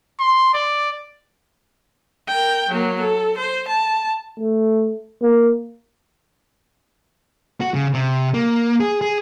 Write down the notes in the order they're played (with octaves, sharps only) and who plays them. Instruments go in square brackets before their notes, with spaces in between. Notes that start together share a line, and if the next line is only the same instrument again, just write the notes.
[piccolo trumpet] C6
D5
[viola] A#4 G5
F#3 A#3
A4
C5
A5
[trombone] A3
A#3
[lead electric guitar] F#4
C#3
C3
A#3
G#4
G#4